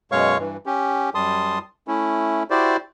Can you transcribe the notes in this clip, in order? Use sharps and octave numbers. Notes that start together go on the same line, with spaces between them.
F#2 B2 G#3 C#5 F5 C#6
G2 E3
C#4 G4
F#2 G3 A5 C6 D#6
A3 C#4 E4
E4 F#4 G4 C5 D5